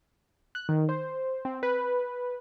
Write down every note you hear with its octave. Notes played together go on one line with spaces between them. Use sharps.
F#6
D#3
C5
C4
B4